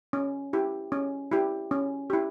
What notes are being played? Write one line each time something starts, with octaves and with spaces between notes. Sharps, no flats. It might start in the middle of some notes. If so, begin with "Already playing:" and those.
C#4
E4 G4
C#4
E4 G4
C#4
E4 G4